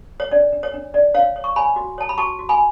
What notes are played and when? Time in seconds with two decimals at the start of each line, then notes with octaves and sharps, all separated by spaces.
0.20 C#5
0.31 D4 D5
0.53 D4
0.63 C#5
0.74 D4
0.94 D4 D5
1.14 D4 C#5 F5
1.36 C#5
1.44 C#6
1.56 C#5 G#5 B5
1.76 F#4
1.98 C#5 A5
2.09 B5
2.18 F#4 A5 C#6
2.39 F#4
2.49 G#5 B5